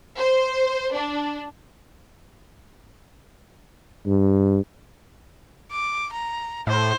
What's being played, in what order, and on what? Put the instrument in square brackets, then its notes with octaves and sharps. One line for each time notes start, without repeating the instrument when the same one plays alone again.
[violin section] C5
D4
[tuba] G2
[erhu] D6
A#5
[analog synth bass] A2 [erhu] C5